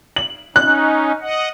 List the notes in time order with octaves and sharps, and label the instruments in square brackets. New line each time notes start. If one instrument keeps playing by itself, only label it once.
[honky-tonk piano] F#7
[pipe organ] C#4 D#4 [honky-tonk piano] F#6
[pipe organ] D#5 F#5